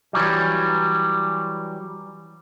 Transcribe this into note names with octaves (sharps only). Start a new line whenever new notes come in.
E3 F#3 G3